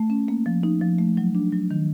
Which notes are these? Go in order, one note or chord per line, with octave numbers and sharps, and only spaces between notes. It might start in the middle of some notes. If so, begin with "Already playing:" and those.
Already playing: A3
C#4
A#3
F3
D#4
F3
A3
F#3
D4
F#3
D#3